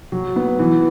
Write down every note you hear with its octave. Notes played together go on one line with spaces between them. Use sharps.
F#3
B3
E3